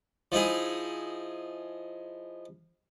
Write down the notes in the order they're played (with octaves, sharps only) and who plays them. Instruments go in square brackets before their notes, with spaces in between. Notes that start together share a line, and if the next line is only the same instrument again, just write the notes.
[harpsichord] F3 D#4 E4 G#4